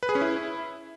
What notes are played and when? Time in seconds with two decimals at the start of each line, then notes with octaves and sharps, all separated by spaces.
0.03 B4
0.09 G#4
0.15 C#4
0.21 E4